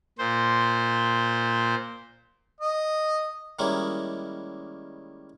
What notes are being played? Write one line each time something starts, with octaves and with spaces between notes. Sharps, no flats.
A#2 C5
D#5
D#3 G3 G#3 A#3 C#4 E4